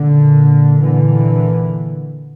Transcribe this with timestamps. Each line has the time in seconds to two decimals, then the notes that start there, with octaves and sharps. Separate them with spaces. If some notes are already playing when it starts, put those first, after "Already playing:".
Already playing: A#2 D3
0.81 A#2 D3 E3